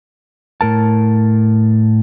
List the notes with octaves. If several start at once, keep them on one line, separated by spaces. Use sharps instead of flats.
A2 A#4 A5